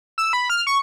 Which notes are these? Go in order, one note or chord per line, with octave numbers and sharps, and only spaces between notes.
E6
B5
F6
C#6